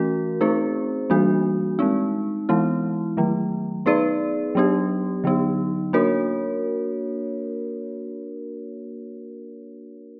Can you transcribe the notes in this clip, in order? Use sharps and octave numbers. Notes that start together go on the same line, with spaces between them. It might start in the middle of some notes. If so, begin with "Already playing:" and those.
Already playing: E3 A3 C#4 F#4 A#4
A3 C4 D#4 G#4 C5
E3 G3 A#3 D4 F#4
G#3 C4 D#4
E3 G#3 B3 E4
D#3 F#3 A3
B3 D#4 G#4 B4 D5
F#3 B3 D4 G4
D3 F#3 B3 D#4
A#3 D4 F#4 A#4 C#5